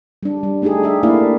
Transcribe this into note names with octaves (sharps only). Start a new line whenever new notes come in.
G3 D4
G3
A3 D4 D#4 G4 G#4
G4 E5
A3 A#3 D4 E4 D5 F5